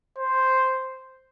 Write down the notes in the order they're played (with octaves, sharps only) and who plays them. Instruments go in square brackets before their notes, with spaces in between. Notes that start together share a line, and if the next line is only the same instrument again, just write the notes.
[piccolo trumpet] C5